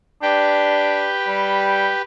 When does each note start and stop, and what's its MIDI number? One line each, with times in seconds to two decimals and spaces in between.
0.22 1.12 62
0.22 2.02 67
0.22 2.02 71
0.22 2.02 79
1.27 1.89 55